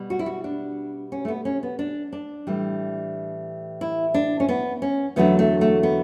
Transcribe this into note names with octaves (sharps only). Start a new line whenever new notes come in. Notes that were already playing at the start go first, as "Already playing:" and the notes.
Already playing: B2 G3
F#4
E4
F#4
D4
C#4
A3
B3
C#4
B3
D4
D4
A2 E3 G3
E4
D4
C#4
B3
C#4
E2 D3 F#3 A3 B3
A3
A3
B3